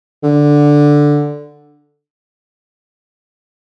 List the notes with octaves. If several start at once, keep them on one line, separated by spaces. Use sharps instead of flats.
D3